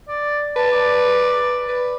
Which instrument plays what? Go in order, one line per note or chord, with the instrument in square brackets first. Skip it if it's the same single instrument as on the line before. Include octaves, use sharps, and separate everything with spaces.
[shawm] D5
[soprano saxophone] B4 [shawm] A5
[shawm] D5
[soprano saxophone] B4